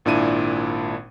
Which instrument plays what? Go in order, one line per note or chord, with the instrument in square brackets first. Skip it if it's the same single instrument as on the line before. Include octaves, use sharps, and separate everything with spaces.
[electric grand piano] G#1 A#2 D4 E4 D#7